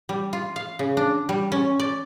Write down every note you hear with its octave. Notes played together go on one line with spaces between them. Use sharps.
G3
F4
F5
C#3
D4
G3
C#4
D5